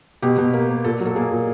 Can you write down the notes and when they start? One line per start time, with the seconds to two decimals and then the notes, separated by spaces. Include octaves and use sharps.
0.22 B2 G4
0.38 B2
0.54 A#3
0.70 A#3
0.84 A#2 A4
1.00 F#3
1.06 A4
1.16 A#3 G#4
1.32 A#2